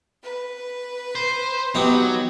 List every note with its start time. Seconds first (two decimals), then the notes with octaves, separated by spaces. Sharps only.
0.23 B4
1.15 C5
1.75 F#3 B3 D#4 G4